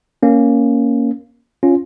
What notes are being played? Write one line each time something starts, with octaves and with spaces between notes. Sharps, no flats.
A#3 C#4
C#4 F4